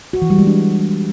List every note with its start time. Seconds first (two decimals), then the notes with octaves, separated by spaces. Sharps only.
0.13 F#4
0.22 E3
0.30 G3
0.38 G#3
0.47 D4